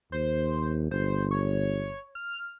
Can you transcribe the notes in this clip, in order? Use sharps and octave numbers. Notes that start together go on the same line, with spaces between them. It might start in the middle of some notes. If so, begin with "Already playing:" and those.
D#2 C5
G1 C5
C#5
F6